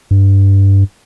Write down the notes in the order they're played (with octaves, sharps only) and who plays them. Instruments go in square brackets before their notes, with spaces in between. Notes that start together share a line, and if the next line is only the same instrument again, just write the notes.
[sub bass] G2